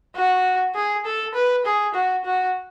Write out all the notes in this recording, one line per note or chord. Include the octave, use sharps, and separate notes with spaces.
F#4
G#4
A4
B4
G#4
F#4
F#4